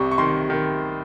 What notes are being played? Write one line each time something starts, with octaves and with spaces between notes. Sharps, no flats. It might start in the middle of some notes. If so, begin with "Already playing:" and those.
Already playing: C2 C3 C#6
C#6
D#3 C6
D#3